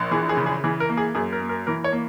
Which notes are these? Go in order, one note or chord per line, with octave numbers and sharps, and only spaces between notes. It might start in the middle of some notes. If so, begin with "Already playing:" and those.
Already playing: A#1
E3 G#4
G#4
C#3
G#4
E3 G#4
A#4
A#3
G#4
F#2 G#4
A#4
A#3
A#4
E3 A#4
C#5
A#3